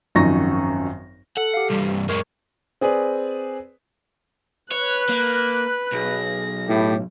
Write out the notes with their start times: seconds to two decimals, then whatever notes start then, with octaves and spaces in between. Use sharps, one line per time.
0.15 G#1 F#2 F3 D#4 C#6 A#6
1.37 A4 F#5
1.54 G4 F5
1.70 C2 G2
2.09 F#2 G#3 A#4 C#6 G#6
2.81 C4 G#4 B4 D5
4.72 B4 C#5 F#6
5.09 A#3
5.92 B1 G#4 A#6
6.68 A2 G4